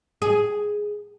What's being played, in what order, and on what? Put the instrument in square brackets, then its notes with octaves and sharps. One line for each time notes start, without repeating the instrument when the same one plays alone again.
[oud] G#4